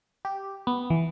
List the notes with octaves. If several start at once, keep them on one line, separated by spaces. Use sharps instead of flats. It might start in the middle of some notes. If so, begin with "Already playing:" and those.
G4
B3
E3